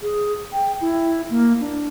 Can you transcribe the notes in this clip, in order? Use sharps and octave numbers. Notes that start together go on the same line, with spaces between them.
G#4
G5
E4
A#3
D4